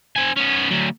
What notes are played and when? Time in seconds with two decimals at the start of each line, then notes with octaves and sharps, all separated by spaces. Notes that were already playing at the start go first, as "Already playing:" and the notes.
0.16 C4 G#5
0.37 B3 C#4
0.71 D2 F#3